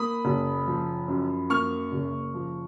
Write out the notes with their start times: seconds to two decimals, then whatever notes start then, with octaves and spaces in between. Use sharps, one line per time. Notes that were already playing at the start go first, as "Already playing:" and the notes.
Already playing: A#3 B5 D#6
0.25 F#1
0.67 F3
1.08 F#2
1.50 A#3 C#6 F6
1.92 F#1
2.34 F3